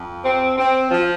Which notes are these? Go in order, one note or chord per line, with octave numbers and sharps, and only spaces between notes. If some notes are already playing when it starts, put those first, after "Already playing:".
Already playing: F2
C4
C4
F3